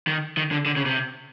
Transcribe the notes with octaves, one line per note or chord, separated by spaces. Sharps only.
D#3
D#3
D3
D3
C#3
C3